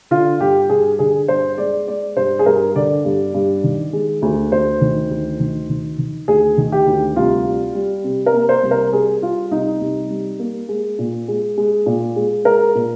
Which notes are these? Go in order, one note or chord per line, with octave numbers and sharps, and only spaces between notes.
D3 F4
G2 G4
G2 G#4
D3 G#4
G2 C5
G#3 D5
G#3 D5
G2 C5
G#4
G2 A#4
D3 D5
G2
G2
D#3
G#3
D2
D2 C5
D#3
D2
D#3
D#3
D#3
D2 G#4
D#3
G4
D2
C2 F4
G3
G3
C3
A#4
A#3
C5
C2
A#4
G3 G#4
G3 F4
C2 D#4
C2
G3
A#3
G#3
A#2
G#3
G#3
A#2
G#3
G#3 A#4
A#2